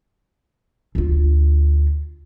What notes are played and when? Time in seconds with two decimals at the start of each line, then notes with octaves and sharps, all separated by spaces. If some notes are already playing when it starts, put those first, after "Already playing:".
0.95 D2 F4